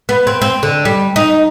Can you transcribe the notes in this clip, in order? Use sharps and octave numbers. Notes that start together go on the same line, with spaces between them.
B3
C4
C4
D3
G3
D#4